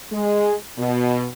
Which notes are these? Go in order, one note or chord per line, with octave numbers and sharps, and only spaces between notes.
G#3
B2